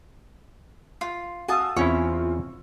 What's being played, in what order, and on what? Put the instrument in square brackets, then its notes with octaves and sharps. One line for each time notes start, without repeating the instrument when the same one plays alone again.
[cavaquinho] F4
[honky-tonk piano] F#4 F5 E6 [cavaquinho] G#5 A5 D#6
[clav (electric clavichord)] E2 C#4 E4 [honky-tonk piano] C4 F4 [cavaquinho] C#5